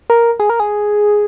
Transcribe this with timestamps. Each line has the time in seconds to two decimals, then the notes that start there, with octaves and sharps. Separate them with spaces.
0.10 A#4
0.40 G#4
0.50 A#4
0.60 G#4